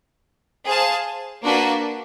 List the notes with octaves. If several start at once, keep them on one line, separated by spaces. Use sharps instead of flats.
G#4 C5 F5 A5
A#3 D4 F#4 B4